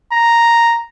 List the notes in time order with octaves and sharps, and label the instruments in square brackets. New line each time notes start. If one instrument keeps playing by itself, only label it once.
[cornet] A#5